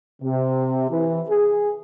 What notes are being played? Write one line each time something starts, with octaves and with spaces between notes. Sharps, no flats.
C3
E3
G#4